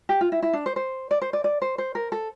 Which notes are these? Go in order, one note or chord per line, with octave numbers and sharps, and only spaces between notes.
G4
F4
E4
E4
D4
C5
C5
D5
C5
D5
D5
C5
C5
A#4
A4